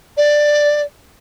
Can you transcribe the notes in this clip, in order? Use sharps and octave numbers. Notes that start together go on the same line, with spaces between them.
D5